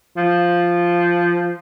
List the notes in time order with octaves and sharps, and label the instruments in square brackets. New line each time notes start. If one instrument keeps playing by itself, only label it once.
[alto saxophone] F3